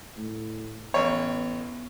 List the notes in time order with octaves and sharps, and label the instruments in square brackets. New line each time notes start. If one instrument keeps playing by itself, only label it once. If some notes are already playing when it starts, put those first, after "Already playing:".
[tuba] A2
[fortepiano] A1 C#5 [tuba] B3